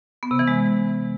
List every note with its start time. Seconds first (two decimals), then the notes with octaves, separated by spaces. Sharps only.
0.23 B3
0.31 C3
0.39 E3
0.48 G#3